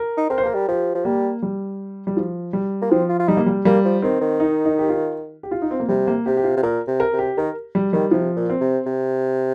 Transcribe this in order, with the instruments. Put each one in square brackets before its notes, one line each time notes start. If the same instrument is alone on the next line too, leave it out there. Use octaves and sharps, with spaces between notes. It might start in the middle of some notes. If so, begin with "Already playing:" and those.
Already playing: [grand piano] A#4
[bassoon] D#4
[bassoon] C4 [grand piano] A#4
[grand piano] C5
[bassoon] A#3 [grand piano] A#4
[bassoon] G3
[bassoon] F3 [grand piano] G4
[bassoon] F3
[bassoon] G3 [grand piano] A#3
[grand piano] G3
G3
F3
G3
[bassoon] A#3
[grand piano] F3 [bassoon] C4
[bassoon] F4
F4
[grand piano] G3 [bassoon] D#4
[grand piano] A#3
G3
[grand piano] G3 [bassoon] A#3
[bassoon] F3
[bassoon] D#3 [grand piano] C4
[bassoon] D#3
[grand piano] D#4
D#4
G4
F4
G4
F4
D#4
C4
A#3
[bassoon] C3 [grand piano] G3
[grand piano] A#3
[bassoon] C3 [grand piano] G4
[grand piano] G4
F4
[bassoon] C3
[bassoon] A#2 [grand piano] A#4
[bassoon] C3
[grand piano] A#4
[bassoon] C3
[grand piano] G4
[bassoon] D#3 [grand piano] A#4
[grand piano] G3
[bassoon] D#3 [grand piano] G3
[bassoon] C3 [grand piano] F3
[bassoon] A#2
[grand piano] C4
[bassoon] C3
C3